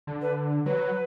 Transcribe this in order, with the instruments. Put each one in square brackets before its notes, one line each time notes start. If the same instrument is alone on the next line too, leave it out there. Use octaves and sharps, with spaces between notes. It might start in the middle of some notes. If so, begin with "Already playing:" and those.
[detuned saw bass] D3
[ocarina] B4
[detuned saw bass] F#3 [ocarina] B4